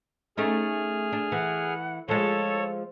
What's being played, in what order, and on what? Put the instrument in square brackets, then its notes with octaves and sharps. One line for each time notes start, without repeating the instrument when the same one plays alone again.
[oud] A3 C#4 D#4 [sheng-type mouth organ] G#4 F6
[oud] D4
[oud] E3 [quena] F#5
[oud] F3 G#3 [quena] A4 [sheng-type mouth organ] C#5